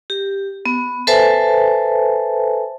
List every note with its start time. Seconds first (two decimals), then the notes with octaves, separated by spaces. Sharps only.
0.10 G4
0.65 B3
1.07 A4 B4 C5 E5 G#5 A5